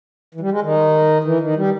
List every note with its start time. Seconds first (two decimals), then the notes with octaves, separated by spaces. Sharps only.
0.34 E3
0.40 G3
0.51 G#3
0.61 D#3
1.24 E3
1.40 D#3
1.56 G3